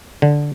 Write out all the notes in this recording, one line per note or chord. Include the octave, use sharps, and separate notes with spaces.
D3